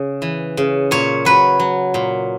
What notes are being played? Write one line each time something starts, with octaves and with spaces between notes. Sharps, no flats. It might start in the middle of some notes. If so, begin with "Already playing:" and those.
Already playing: C#3
E3
C#3
A#2 C#5
F#3 B4
F#3
A#2